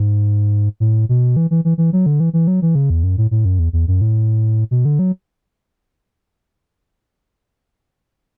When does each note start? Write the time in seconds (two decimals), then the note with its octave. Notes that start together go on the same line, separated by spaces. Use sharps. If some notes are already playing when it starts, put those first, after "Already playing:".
Already playing: G#2
0.80 A2
1.09 B2
1.37 E3
1.51 E3
1.65 E3
1.78 E3
1.93 F#3
2.06 D3
2.20 E3
2.33 E3
2.47 F#3
2.62 E3
2.75 C#3
2.90 E2
3.03 F#2
3.18 A2
3.31 A2
3.45 F#2
3.59 E2
3.73 E2
3.88 F#2
4.01 A2
4.71 B2
4.85 D3
4.99 F#3